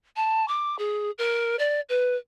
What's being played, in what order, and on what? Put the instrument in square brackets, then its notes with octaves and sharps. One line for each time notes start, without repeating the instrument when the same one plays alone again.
[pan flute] A5
D6
G#4
A#4
D5
B4